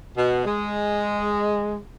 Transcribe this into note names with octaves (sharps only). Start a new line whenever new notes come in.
B2
G#3